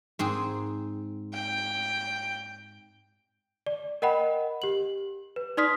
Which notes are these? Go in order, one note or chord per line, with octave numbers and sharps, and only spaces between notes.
G#2 C4 G#4
G5
D5
A#4 D#5 F#5 G5 B5
G4 F#7
B4
D#4 D5 C6 D#6 F6 B6